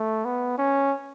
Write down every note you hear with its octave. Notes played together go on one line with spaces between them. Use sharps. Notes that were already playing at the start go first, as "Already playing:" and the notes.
Already playing: A3
B3
C#4